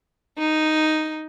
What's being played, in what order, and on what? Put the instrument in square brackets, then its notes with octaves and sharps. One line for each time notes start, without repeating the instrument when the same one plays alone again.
[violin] D#4